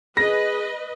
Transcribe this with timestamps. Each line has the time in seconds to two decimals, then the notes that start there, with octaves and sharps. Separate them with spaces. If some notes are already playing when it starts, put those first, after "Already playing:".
0.17 G#4 B4 D#5 A#6